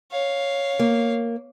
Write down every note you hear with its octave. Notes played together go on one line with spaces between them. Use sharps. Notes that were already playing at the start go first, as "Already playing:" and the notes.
C#5 F5
A#3